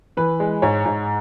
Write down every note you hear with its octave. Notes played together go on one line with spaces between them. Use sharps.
E3 B4
G#3
G#2 C#5
G#2